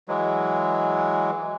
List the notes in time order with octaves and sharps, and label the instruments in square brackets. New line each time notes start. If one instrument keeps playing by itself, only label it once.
[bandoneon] E3 F#3 G#3